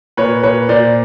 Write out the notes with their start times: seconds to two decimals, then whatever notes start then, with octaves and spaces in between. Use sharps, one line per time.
0.17 A#2 B4 C#5
0.43 A#2 B4 C#5
0.69 A#2 C5 D5